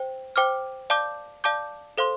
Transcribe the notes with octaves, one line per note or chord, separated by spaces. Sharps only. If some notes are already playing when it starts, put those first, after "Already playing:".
Already playing: C5 G5
C5 G5 D6 F6
D5 F5 A5 D6 G6
D5 F5 A5 D6 G6
A4 C5 F5 C6